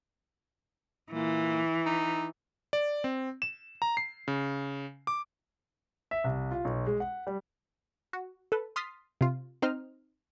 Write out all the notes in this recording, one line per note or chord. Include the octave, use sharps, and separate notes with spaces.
A#2 E3
D#4
D5
C4
E7
A#5
C7
C#3
D6
E5
C2
F4
B1
G#3
F#5
G3
F#4
A4 B4
C6 D#6 F6 A6 B6 C7
C3 F4
C4 D#4 C5 D#5 F6